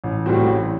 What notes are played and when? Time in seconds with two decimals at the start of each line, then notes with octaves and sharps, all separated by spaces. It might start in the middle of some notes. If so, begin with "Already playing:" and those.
0.04 A1
0.26 A2 G3 C4 F#4
0.47 A1